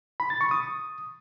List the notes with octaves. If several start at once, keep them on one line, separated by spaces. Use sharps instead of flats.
B5
A6
C#6
D#6